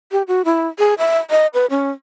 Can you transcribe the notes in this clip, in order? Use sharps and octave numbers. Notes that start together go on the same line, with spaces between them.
G4
F#4
E4
G#4
E5
D#5
B4
C#4